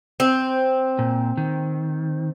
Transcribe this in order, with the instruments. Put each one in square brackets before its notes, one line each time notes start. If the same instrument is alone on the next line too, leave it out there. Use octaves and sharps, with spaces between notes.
[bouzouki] C4
[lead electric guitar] A#2
D#3